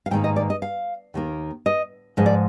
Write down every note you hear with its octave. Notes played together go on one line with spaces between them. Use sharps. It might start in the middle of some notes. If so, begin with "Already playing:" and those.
F5
G#2 D#3 A#3 G5
D#5
D5
D#5
F5
D#2 D#3 A#3
D#5
G#2 F3 G#3 D#5
D5